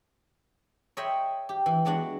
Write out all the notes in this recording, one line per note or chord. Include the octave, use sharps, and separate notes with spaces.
C#5 D#5 E5 G5 B5 C6
G4
E3
G#3 B3 D4 F#4 F#5